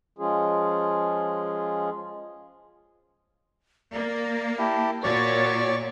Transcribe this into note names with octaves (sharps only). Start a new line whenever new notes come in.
F3 G#3 C#4 F4 G#4
A#3 D5
E4 G4 A5
A#2 F#4 C#5 D5 C#6 A6